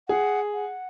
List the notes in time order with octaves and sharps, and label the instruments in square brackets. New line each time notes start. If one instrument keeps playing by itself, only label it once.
[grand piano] G#4 [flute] F#5
[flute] F#5